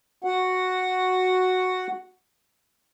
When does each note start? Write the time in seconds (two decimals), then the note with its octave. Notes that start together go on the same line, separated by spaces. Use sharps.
0.24 F#4 F#5